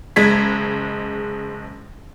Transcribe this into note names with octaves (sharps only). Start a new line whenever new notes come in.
F#1 G#3 G#6 B6